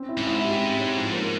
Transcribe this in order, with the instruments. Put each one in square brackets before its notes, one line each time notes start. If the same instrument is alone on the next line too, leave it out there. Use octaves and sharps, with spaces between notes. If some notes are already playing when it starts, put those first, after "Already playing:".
Already playing: [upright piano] C4 C#4
E4
[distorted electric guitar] G#2
[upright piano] E4
G4
C4
C#5
F3
A#3